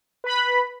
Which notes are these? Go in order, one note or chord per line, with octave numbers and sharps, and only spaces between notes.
B4 B5